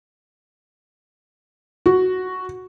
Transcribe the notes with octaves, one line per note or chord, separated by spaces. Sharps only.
F#4